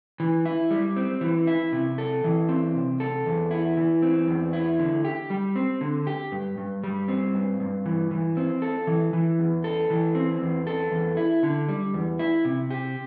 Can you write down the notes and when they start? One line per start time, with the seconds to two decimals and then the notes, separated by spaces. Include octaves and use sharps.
0.20 E3
0.45 E4
0.71 G3
0.96 C4
1.21 E3
1.47 E4
1.72 C3
1.98 A4
2.24 E3
2.49 C4
2.75 C3
3.00 A4
3.26 E2
3.51 E4
3.77 E3
4.02 C4
4.27 E2
4.53 E4
4.79 D3
5.05 G4
5.30 G3
5.56 C4
5.81 D3
6.07 G4
6.32 G2
6.58 G2
6.83 G3
7.08 C4
7.34 G2
7.60 G2
7.86 E3
8.11 E3
8.37 C4
8.62 A4
8.87 E3
9.13 E3
9.39 E2
9.64 A4
9.90 E3
10.15 C4
10.41 E2
10.67 A4
10.92 E2
11.17 E4
11.43 D3
11.68 G3
11.94 E2
12.19 E4
12.45 C3
12.70 G4